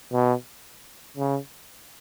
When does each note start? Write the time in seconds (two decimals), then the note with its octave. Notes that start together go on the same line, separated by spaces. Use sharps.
0.13 B2
1.17 C#3